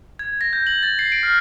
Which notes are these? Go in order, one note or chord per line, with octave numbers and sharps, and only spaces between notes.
G#6
A#6
G6
F#7
A6
C7
D7
F6